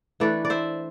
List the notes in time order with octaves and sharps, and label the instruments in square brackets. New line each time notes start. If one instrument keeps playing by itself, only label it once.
[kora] E3 A3 D4 B4 D5
D5
C5 E5